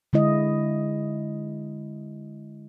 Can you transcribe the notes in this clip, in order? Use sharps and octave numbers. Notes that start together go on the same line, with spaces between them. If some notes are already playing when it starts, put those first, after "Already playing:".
D3 G#3 E4 D#5